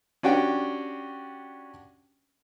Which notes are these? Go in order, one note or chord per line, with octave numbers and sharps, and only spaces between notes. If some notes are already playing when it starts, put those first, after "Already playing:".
C#4 D4 F#4 G4 G5